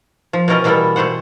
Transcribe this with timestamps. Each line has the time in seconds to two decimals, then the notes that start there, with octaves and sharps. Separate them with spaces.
0.33 F3
0.48 B2 E3 C#4 A#4 D5 D#5
0.64 B2 E3 G3 A#3 B3 A4
0.96 B2 A3 G4 C5 F#5